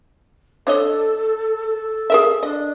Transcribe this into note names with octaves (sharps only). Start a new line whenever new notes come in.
D4 A4 C#5 D#5
A4
G#4 A#4 E5
D4 D#5